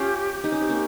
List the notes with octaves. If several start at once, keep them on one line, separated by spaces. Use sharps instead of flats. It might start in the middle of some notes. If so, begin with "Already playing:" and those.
Already playing: C#4 F4 G4
D#4
C#4
C4
A#3 C#4